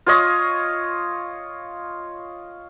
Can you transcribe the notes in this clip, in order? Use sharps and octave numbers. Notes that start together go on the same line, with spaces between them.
F4 C#5 D#5